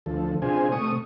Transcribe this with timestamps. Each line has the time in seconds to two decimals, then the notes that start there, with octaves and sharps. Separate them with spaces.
0.06 D2 F3 A4
0.42 C3 D4 F4 G#4 C5 G#5
0.72 C3 A3 C#6 D#6